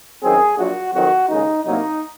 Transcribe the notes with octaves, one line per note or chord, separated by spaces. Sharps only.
F#2 D#3 F#3 C4 G#4
A#1 A#2 F#3 F#4
F2 D#3 F#3 C4 F#4
D#2 C#3 G#3 D#4
C2 C3 F#3 A#3 D#4